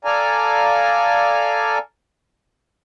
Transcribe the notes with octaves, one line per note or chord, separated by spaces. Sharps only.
A4 D5 F5 G#5 A#5